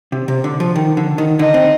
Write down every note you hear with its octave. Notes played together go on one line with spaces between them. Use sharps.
C3
C3
D3
F3
D#3
D3
D#3
D3 D#4
C4